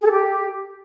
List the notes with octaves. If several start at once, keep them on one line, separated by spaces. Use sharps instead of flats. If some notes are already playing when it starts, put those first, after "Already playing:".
G#4
A4
G4